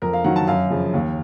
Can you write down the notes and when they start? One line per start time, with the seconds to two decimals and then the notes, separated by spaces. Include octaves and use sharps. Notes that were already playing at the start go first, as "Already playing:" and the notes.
0.02 F2 A#4
0.13 F5
0.24 D#3 F#3 F#5
0.36 A5
0.48 F#2 F5
0.70 C#3 F3
0.93 D#2